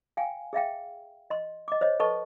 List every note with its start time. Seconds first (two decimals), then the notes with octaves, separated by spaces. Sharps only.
0.17 F5 G5 G#5
0.53 G#4 E5 F5 G5
1.30 D#5 C6
1.68 D#5 D6
1.81 C5 C#5 D#5
2.00 A4 B4 D#5 A5 C#6